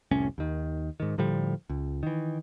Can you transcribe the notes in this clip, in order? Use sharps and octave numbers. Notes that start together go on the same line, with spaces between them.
F1 C2 A2 C#4
D#2 D#3
G#2 D#3
A2 D3 F3 G3
C#2
D#3 E3